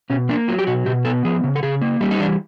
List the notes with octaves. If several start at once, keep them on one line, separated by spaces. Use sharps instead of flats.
B2 C#4
A#3 D4
F#3 F4
G4
B2 F#4
B2 G4
B3 A4
F3 G#4
C#3
A4
C#3 G#4
A#3
G3 D#4
D#4
E3 D4